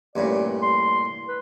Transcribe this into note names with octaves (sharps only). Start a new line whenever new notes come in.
A1 G2 A#2 D5
C6
B4